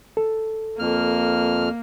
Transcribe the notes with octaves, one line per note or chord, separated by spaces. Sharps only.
A4
F2 A#3 F6